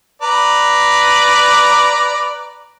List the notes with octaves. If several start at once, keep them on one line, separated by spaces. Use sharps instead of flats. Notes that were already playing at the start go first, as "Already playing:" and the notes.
B4 D5 A#5